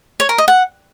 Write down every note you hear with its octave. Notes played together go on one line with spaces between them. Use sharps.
C#5
A#4
D#5
F#5